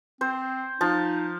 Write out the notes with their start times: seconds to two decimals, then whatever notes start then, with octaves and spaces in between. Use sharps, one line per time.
0.21 C4 C5
0.81 F3 D#4 A5